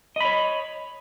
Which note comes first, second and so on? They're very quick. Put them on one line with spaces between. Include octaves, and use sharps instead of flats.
D#5 B5 C#5